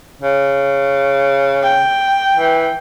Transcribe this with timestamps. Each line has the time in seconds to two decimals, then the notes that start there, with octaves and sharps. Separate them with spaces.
0.21 C#3
1.63 G5
2.36 E3